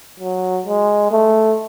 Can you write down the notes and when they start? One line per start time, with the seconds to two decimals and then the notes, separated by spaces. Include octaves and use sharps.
0.20 F#3
0.66 G#3
1.12 A3